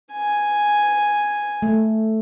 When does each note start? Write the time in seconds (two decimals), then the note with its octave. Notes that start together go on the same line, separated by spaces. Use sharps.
0.12 G#5
1.62 A3